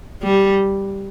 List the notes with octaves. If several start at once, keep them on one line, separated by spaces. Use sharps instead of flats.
G3